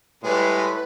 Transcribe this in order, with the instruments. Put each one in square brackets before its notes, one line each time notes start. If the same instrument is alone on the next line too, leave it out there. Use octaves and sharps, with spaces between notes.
[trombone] A2 [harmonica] G3 G#3 [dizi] B4